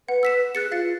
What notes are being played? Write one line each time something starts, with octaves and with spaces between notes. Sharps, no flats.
B4 F#5
E6 B6 E7
G#4 F#6 A6 C#7
F4 F5 A6